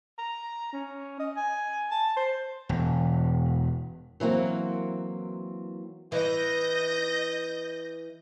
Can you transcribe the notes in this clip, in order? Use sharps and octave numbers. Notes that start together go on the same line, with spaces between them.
A#5
C#4
D#5
G#5
A5
C5
E1
E3 F#3 A#3 C4
E3 D#5 G6 A#6